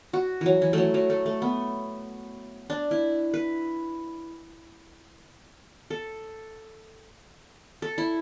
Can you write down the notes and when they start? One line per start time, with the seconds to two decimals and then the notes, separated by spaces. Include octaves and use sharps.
0.13 F#4
0.41 E3 F#3
0.62 E3
0.73 F#3 A3
0.94 F#3
1.10 A3
1.26 A3
1.42 B3
2.70 D4
2.91 E4
3.34 B4
5.90 A4
7.82 A4
7.98 E4